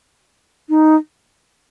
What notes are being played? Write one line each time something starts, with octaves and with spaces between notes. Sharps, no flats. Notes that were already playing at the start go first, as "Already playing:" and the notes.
D#4